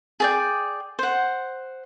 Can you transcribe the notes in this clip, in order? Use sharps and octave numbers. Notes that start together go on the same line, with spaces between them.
G#4 D5 G5
C5 F#5